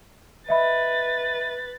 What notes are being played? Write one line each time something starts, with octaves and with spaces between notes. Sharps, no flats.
B4 D#5 E5 B5 A6